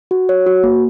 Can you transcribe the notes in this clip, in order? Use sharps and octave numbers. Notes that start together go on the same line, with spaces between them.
F#4
C#5
F#4
A#3